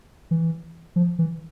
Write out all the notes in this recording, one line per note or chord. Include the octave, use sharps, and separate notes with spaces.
E3
F3
E3